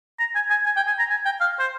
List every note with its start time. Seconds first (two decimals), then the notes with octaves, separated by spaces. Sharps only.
0.19 A#5
0.35 G#5
0.50 G#5
0.65 G#5
0.76 G5
0.87 G#5
0.99 A#5
1.10 G#5
1.25 G5
1.40 F5
1.59 C5